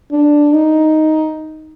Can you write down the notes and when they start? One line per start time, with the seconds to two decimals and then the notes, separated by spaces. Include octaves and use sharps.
0.12 D4
0.53 D#4